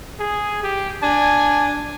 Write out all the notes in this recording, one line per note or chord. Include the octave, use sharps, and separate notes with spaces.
G#4
G4
D4 G#5